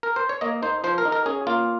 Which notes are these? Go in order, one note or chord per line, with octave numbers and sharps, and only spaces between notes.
A#4
C5
C#5
A#3 D#5
D#4 C5
F3 C5
A#4
D#4
A#4
C#4 G#4
A#3 F4